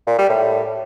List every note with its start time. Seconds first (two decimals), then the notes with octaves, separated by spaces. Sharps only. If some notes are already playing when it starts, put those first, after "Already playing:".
0.07 A#2
0.18 G3
0.29 A2